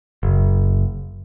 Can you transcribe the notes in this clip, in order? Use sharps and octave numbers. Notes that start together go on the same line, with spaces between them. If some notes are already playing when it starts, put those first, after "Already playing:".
F#1